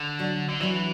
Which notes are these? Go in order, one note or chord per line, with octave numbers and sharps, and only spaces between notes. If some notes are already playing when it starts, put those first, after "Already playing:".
Already playing: D3
F#3 D4 F#4
D3
E3 F#3 D4 F#4